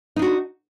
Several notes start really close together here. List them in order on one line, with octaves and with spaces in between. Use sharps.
D#4 D4 F#4